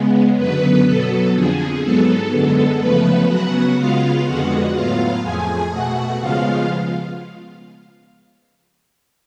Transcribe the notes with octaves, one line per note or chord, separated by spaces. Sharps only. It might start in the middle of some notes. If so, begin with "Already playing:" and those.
Already playing: C#3 G#3 B3
F#2 D3 F#3 B3 B4
B2 F#3 B3 A4
F2 D3 F3 G#4
G#2 F#3 B3 A4
F#2 D3 G#3 B3 A4
C#3 F3 A3 B3 B4
C#3 F#3 B3 F#4 F#5
C#3 G#3 B3 F4 F5
F2 D3 F3 G#3 B3 F#4 F#5
A2 F#3 B3 F4 F5
F2 F3 A3 G#4 G#5
B2 A3 F#4 F#5
C#3 F3 G#3 B3 F4 F5